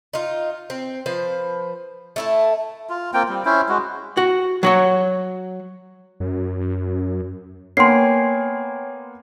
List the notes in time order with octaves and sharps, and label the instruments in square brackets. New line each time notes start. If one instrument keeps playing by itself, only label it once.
[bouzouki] D#4 F4
C4
F3 B4 C5
A3 E4 A5
[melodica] F4
A#3 C4 F4 G5
G3 C4
C#4 E4 C5
G#3 F#4
[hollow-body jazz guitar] F#4
F#3 F#4 C#5
[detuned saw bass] F#2
[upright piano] A#3 B3 [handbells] C#5 G5 G#5 [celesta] C6 C7